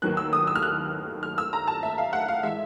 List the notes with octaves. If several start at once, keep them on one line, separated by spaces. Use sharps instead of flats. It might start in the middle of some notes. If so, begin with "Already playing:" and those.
D#2 D#3 F#3 B3 F#6
E6
D#6
E6
F6
F#6
F6
E6
A#5
A5
E5
F5
F#5
F5
A2 E3 G#3 E5